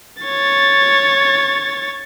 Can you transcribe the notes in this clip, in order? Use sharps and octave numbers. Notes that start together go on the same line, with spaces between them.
C#5 A6